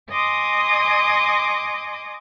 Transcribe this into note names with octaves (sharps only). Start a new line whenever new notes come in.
D#5 G#5 C6 D6 D#6